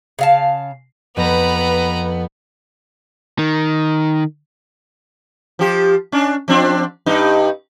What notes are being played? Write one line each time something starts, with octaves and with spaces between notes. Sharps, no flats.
C#3 F5 A5
F2 B3 B4 A#5
D#3
F3 G4
C#4 D4
F3 C4 D4
G2 D#4